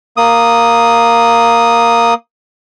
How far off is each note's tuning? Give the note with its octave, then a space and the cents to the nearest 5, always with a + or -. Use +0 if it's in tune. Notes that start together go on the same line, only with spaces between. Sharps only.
A#3 +0 D#6 +0